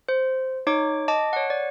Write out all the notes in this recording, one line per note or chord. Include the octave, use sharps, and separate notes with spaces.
C5
D#4 C#5 D6
D#5 A5 D6
C#5 F#5
D5